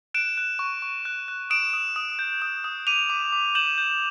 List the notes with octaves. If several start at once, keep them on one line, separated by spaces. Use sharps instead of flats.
F#6 D7 E7
F#6
C#6
C#6
F#6
F#6
D#6 D7 E7
D#6
D#6
G6
D#6
D#6
D6 D#7 F7
D6
D6
G6 E7 F#7
G6